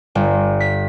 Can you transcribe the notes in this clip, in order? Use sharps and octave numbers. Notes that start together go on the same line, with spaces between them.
G1
B6